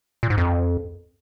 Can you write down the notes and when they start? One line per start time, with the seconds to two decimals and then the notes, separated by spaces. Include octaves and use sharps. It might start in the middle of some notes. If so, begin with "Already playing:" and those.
0.23 A#2
0.30 G#2
0.38 F2